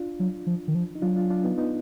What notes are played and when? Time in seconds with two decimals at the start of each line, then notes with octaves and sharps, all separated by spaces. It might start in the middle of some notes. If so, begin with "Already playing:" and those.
Already playing: D4 F4
0.20 F#3
0.47 F3
0.68 D#3
0.75 F3
0.95 D#4
1.02 F#3 D4 F4
1.16 D4 F4
1.30 D4 F4
1.43 B3 D#4
1.58 B3 D#4